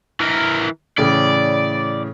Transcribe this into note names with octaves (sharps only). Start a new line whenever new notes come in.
E3 A#4
A2 C#3 E3 D5